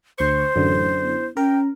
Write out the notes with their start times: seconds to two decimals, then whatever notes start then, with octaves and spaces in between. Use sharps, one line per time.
0.18 D2 C5 C6 C#6
0.56 A1 F#2 D3
1.01 B3 E4
1.37 C#4 A#4 G5